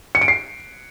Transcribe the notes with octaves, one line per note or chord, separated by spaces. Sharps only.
C#7
D7
C7